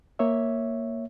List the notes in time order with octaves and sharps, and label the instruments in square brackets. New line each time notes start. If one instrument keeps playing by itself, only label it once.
[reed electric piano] A#3 C#5 E5